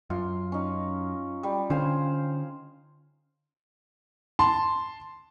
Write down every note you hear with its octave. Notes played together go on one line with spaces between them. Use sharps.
F#2 F4
C#4 D#4
G3
D3 C#4 C5 F5 G#5
A5 C6